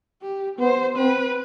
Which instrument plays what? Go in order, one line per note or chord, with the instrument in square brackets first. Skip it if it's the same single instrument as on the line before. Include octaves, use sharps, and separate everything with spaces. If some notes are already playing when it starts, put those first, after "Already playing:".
[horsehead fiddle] G4
[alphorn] B3 [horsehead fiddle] C5
[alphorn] C4 [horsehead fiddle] B4